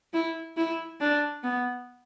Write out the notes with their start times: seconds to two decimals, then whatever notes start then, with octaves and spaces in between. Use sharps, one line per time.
0.13 E4
0.57 E4
1.01 D4
1.43 B3